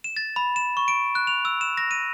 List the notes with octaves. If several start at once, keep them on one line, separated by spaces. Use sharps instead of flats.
E7
A6
B5
E7
C#6
D7
F#6
F7
E6
E7
A#6
D#7